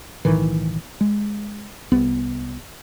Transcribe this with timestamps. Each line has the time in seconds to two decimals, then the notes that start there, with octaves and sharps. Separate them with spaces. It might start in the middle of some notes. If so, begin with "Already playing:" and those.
0.25 B1 A2 D#3 E3
1.01 G#3
1.92 C2 B3